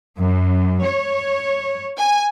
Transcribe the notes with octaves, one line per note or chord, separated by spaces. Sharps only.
F#2
C#5
G#5